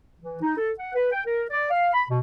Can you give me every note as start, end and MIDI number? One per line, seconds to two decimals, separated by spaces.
0.21 0.37 52
0.42 0.57 63
0.58 0.71 69
0.79 0.92 78
0.94 1.09 71
1.12 1.22 79
1.25 1.44 70
1.50 1.70 74
1.70 1.91 77
1.94 2.03 83
2.09 2.19 47